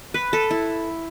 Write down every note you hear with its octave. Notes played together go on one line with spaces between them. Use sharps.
B4
A4
E4